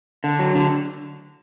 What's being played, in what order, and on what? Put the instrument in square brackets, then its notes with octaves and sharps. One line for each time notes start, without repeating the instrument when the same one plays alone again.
[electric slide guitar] D3
F#3
D3